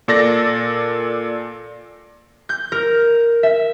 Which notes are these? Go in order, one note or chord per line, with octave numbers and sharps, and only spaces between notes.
A#2 A4 D5 A6 A#6
G6
A#4
E5